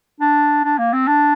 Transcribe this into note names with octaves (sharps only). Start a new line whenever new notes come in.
D4
D4
A#3
C4
D4